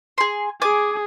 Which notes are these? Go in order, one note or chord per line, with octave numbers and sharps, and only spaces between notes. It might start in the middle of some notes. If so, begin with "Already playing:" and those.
G#4 C6
G#4 G#5 D6